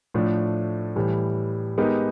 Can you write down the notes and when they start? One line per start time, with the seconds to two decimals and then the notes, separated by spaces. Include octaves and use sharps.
0.14 A2 F3 A3 D4
0.96 A2 E3 G3
1.78 G#3 B3 D#4 G4 A#4